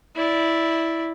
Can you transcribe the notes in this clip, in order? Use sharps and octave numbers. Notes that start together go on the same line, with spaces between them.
E4 D5